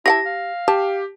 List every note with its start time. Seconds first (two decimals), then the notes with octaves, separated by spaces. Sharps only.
0.06 E4 G4 F#5 A5 A#6
0.25 F5
0.68 G4 A5